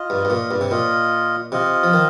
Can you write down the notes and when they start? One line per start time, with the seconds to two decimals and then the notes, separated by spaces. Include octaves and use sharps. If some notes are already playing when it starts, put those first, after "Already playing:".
Already playing: F4 D#5
0.10 G2
0.25 G2
0.30 A#2
0.51 G2
0.61 C3
0.71 A#2 F4 D#5
1.52 C3 F4 D#5
1.83 F3
1.94 D#3